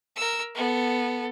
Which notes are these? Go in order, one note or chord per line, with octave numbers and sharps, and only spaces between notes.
A#4 E6
B3 A4